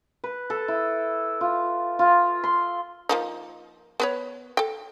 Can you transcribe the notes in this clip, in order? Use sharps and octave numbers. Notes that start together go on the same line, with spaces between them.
B4
A4
E4
F4
F4
C6
F3 A#3 D#4
B3 B4 C#5
A4 G5